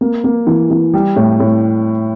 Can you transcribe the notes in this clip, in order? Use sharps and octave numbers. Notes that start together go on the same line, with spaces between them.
A#3
A#3
E3
E3
G3
A2
A2